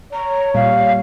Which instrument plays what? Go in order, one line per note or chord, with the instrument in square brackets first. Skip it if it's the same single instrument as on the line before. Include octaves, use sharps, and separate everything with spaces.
[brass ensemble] C#5 [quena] A#5
[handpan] A#2 G3 [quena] F5